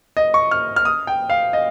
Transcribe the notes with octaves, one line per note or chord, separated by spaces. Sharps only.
D#5
C#6
F6
F6
D#6
G5
F5
D#5